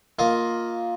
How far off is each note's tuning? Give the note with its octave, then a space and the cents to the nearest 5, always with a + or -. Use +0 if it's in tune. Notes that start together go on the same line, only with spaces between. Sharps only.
A#3 +0 F4 +5 D#5 +15